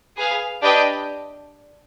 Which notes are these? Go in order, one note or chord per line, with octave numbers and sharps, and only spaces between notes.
G#4 B4 F5
D4 G4 B4 D#5 G5